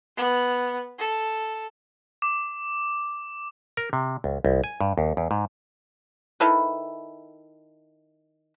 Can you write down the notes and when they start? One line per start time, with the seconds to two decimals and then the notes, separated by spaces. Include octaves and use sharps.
0.17 B3
0.99 A4
2.22 D6
3.77 A#4
3.93 C3
4.24 C#2
4.45 C2
4.64 G#5
4.81 G2
4.98 D#2
5.17 E2
5.31 G#2
6.40 D#3 E4 A4 B4